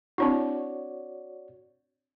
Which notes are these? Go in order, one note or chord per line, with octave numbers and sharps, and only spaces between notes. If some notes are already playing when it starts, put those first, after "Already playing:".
C4 D4 E4 F#4 C#5 D5